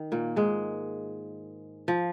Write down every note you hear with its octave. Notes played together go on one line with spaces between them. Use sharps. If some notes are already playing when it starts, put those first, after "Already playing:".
Already playing: D#3
A#2 A#3
G#2 G#3
F3